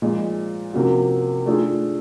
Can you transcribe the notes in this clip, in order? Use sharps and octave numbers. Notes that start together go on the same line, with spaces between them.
A#2 F3 G#3
C3 F3 A#3 C#4 F#4
A3 D4 F4 G#4